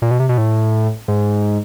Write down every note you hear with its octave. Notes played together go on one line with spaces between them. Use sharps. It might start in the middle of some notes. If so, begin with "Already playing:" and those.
A#2
B2
C3
B2
A2
G#2